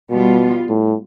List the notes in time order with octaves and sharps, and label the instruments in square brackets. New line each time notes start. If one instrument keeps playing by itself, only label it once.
[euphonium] B2 [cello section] G3 B3 F4
[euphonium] A2